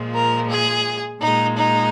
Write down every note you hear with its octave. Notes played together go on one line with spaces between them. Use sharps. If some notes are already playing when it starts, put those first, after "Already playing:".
Already playing: A#2 F3 G#3
A#4
G#4
A#2 G#3 D#4
D#4